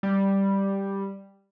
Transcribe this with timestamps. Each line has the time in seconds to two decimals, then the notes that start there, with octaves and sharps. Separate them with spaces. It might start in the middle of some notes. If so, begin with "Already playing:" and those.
0.03 G3